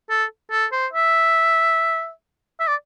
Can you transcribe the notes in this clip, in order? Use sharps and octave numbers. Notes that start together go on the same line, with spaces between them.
A4
A4
C5
E5
E5
D5